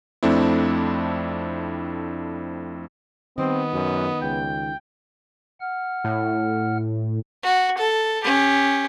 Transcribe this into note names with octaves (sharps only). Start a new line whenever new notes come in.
F2 A3 C4 D4 E4
D#3 G3 B3 C4 D#5
F#2
C#2 G5
F#5 F6
A2
F#4
A4
C#4 G4